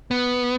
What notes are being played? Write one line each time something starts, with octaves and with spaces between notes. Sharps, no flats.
B3